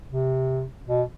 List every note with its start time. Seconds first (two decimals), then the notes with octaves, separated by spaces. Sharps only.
0.11 C3
0.88 B2